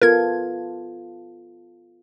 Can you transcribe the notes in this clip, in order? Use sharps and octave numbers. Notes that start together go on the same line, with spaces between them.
B3 F4 A4 A#4 G#6